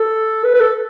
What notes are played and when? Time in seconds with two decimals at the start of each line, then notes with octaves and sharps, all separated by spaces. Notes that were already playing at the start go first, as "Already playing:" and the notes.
Already playing: A4
0.44 B4
0.54 B4
0.60 A4